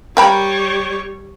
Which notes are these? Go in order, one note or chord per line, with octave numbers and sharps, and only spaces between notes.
G3 A#4 C#5 G5 B5